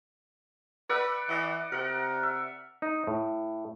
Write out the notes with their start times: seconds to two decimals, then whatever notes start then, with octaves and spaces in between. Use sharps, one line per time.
0.90 B4 D5 E5 F#5
1.29 E3 D5 D#5 F#5
1.72 C3 A#4 F#5
2.23 E5
2.82 D#4
3.07 A2